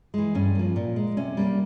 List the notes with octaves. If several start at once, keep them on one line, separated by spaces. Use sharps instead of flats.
E3 G#3
G2 C#4
F3 A#3
A#2
G#3
C3 C#4
G3 A#3